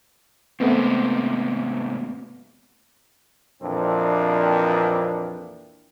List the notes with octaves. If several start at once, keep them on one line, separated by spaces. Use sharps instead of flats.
G#2 C3 A3 B3 C4
F2 A#2 E3 A#3 C4 D4